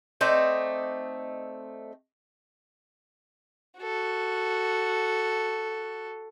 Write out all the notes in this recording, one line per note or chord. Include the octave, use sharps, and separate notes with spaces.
A3 C4 D#4 D5
F#4 A4